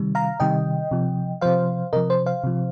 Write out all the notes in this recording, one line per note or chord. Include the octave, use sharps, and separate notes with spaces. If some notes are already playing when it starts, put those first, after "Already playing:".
Already playing: C3 D#3 G3
F5 A#5
C3 D#3 G3 D#5 G5
C3 F3
C3 F3 C5 F5
C3 F3 A#4 D#5
C5
C5 F5
C3 F3